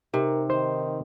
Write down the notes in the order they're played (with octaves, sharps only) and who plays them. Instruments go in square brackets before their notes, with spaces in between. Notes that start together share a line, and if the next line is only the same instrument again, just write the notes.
[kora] C3 [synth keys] D#4 [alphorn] A#4
[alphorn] D#3 [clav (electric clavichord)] C5